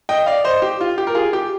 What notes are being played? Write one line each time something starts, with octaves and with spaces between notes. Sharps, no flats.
D#5 G5
D5 F5
C5 D#5
G4
F4
G4
A#4
F4 G#4
G4